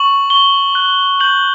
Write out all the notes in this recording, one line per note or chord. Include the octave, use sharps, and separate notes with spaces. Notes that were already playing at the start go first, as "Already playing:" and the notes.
Already playing: C#6 F#7
C#6 G7
F#6
G6 F#7